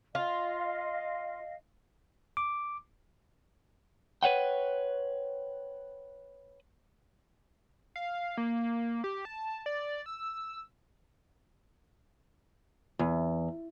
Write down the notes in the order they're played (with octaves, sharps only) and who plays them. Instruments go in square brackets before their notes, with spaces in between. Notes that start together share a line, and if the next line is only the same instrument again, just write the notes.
[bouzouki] F4 [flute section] D#5 F5
[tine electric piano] D6
[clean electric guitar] B4 C#5 F#5 G5
[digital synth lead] F5
A#3
G4
A5
D5
E6
[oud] E2